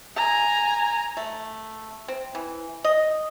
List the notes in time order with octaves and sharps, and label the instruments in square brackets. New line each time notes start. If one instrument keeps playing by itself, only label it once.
[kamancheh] G#5 A#5
[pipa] A3
C4
E3
D#5